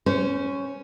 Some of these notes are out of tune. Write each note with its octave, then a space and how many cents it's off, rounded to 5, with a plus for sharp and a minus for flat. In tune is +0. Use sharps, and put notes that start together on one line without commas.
C#4 +5 C5 -25